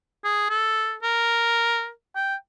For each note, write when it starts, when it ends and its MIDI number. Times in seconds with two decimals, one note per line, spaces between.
0.24 0.50 68
0.50 0.97 69
1.03 1.90 70
2.16 2.35 79